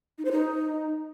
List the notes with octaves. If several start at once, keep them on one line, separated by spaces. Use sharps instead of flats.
D#4
C5
D#4